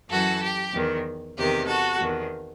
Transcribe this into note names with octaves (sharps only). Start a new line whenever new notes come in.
F#2 E3 F#4 A4
G4
E2 D#3
E2 C3 D#3 G4
F#4 A4
E2 D#3